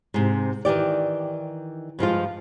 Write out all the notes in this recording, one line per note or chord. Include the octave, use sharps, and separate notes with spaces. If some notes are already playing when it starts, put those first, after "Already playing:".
G#2 C3
D#3 E3 G4 D5
G2 F3 G#3 F4